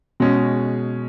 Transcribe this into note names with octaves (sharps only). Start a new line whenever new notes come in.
B2 G#3 C#4 G#4